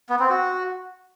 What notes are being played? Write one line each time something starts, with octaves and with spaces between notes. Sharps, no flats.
B3
C4
F#4